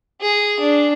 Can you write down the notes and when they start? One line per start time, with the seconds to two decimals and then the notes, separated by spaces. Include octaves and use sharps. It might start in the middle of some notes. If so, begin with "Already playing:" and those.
0.21 G#4
0.60 D4